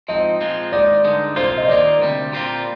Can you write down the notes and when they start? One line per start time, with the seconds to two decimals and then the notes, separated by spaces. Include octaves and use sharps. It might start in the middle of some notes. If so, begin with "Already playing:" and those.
0.08 G#2 F3 C4 D#4 D#5
0.41 A#2 F3 G#3 C4 F4
0.72 G#2 D#3 G#3 D#4 D5
1.04 G2 D3 G#3 D#4
1.36 C2 A#2 F3 A#3 F4 C5
1.58 D#5
1.68 D#2 D#3 A#3 F4 D5
2.01 D2 C3 G3
2.33 A#2 G3 C4 F4